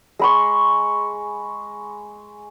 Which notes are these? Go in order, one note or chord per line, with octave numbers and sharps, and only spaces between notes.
G#3 B5 C#6